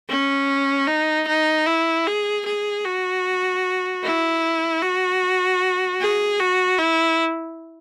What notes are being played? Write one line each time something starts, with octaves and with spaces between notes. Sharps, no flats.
C#4
D#4
D#4
E4
G#4
G#4
F#4
E4
F#4
G#4
F#4
E4